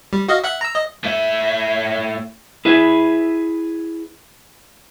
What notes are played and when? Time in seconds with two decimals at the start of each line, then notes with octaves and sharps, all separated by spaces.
0.13 G3
0.28 F#4 D#5 F5
0.44 E5 F#5 F#6
0.61 A#5 E6
0.75 D#5
1.04 A2 E5
2.65 E4 G#4 B4 E5